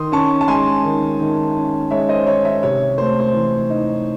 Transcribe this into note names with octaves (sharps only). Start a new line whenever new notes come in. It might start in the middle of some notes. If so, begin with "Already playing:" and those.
Already playing: D#3 C6 D#6
C#4 A5 C#6
A5
G#3 G#5 C6
D#3
D#3
C#4
G#3 C#5 E5
C5 D#5
D#3 C#5
C#5 E5
C3 C#5
A3 C5
C5
E3
D#4